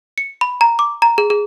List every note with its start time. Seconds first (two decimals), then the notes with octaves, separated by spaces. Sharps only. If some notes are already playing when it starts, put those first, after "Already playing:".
0.18 C#7
0.41 B5
0.61 A#5
0.79 D6
1.02 A#5
1.18 G#4
1.30 G#4